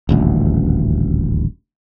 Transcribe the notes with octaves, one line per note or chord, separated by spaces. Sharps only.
D#1 A1 D2